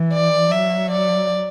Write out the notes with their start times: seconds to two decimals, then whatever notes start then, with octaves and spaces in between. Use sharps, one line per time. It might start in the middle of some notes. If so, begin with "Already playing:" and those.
Already playing: E3
0.13 D5
0.51 F#3 E5
0.91 D5